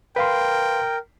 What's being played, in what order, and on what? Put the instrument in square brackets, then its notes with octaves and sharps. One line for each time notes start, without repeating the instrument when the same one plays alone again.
[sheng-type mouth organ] A#4 [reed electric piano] B4 F5 C6 [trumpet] G5